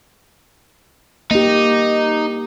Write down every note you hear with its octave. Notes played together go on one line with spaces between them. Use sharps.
A#3 D#4 G4